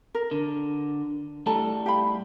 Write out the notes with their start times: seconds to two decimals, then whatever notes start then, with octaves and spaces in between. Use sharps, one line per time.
0.15 A#4
0.31 D3
1.46 A2 G3 A3 A4 A5 A#5
1.86 G4 F5 B5